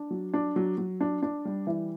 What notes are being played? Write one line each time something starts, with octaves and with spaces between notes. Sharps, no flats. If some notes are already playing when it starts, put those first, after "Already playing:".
Already playing: D4
F#3
D4
F#3
F#3
D4
D4
G3
E3